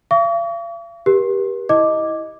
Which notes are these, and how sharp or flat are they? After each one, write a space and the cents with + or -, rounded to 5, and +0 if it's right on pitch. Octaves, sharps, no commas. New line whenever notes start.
F5 -45 C#6 +45
G4 +5 A#4 +45
E4 -10 D#5 +0 D6 +0